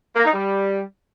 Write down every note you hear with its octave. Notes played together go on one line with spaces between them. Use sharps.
A#3
D#4
G3